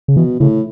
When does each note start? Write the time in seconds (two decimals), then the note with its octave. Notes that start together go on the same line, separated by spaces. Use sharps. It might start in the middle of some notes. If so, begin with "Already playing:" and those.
0.08 C#3
0.16 B2 E3
0.40 A2 C#3